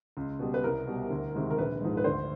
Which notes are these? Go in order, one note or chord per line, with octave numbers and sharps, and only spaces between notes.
C#2
B2 G3
B4
C2 A#4
B2 G3
D2
C3 D#3 G#3
A#4
A#1 B4
G#2 F3 G#3
B4
D2 C5